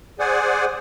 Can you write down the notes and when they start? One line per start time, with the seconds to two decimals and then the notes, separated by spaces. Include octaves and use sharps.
0.19 G#4 C5 D5 F#5 G#5